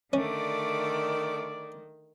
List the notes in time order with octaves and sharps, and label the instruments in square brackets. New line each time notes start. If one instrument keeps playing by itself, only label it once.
[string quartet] D3 A3 D6 [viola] D#3 [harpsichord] C#4 [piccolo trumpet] D5